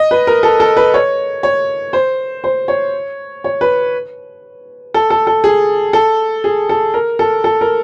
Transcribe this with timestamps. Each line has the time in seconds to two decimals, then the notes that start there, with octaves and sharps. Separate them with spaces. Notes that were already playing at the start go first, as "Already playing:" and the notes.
Already playing: D#5
0.11 B4
0.27 A#4
0.43 A4
0.60 A4
0.77 B4
0.94 C#5
1.43 C#5
1.93 C5
2.44 C5
2.68 C#5
3.44 C#5
3.61 B4
4.94 A4
5.10 A4
5.27 A4
5.44 G#4
5.93 A4
6.44 G#4
6.69 A4
6.94 A#4
7.19 A4
7.44 A4
7.61 A#4